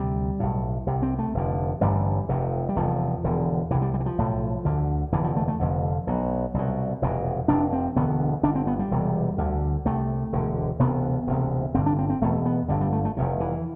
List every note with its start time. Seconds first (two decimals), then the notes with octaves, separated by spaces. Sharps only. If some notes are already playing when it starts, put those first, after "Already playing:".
Already playing: D2 C3 G3
0.40 B1 A2
0.87 C2 C3
1.02 C4
1.19 A3
1.34 F1 F2 D3
1.81 A1 G2 D3 G3
2.28 F1 F2 C3
2.69 G3
2.76 F1 E2 C3 F3
3.24 E1 E2 D3
3.71 C3 E3
3.74 C2
3.82 G3
3.94 G3
4.00 E3
4.06 F3
4.18 B1 A2
4.65 D2 D3
5.12 F1 E2 D3 E3
5.24 F3
5.36 A3
5.48 A3
5.59 F1 F2 D3
6.07 B1 B2
6.54 C2 B2
7.02 F1 E2 B2
7.48 F1 F2 C3 D4
7.73 C4
7.96 E1 D2 D3 B3
8.43 G1 G2 D3 D4
8.55 C4
8.67 B3
8.79 G3
8.91 E1 E2 C3
9.38 D2 D3
9.85 C2 C3 A3
10.32 E1 D2 D3
10.79 E1 D2 C3 B3
11.27 E1 D2 C3
11.74 G1 G2 D3 C4
11.86 D4
11.99 C4
12.10 C4
12.21 E1 E2 B2 A3
12.46 B3
12.68 G1 G2 D3 G3
12.81 G3
12.93 A3
13.05 A3
13.17 F1 E2 C3
13.40 E3